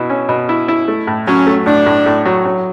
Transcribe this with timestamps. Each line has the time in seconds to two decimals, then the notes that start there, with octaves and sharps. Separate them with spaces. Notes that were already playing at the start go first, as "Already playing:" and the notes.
Already playing: B2 E4
0.10 C#4
0.29 B2
0.49 E4
0.68 E4
0.88 A3
1.07 A2
1.27 F#3 C#4
1.47 A3
1.66 A2 D4
1.86 A2
2.06 A2
2.25 F#3
2.45 F#3